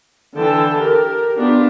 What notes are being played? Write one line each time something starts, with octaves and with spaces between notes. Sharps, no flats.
D3 E3 G5 A5
G4 A#4
B3 D4 F4 G4